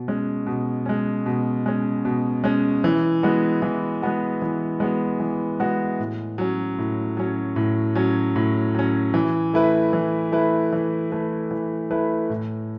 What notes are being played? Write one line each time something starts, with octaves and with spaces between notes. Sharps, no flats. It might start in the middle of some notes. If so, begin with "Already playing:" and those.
Already playing: B2
G#3 C#4
B2
G#3 C#4
B2
G#3 C#4
B2
G#3 C#4
E3
G#3 B3 F#4
E3
G#3 B3 F#4
E3
G#3 B3 F#4
E3
G#3 B3 F#4
A2
F#3 C#4
A2
F#3 C#4
A2
F#3 C#4
A2
F#3 C#4
E3
A3 E4 B4
E3
A3 E4 B4
E3
A3 E4 B4
E3
A3 E4 B4
A2